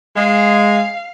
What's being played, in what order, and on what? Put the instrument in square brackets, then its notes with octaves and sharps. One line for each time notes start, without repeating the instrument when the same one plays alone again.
[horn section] G#3 [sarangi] F5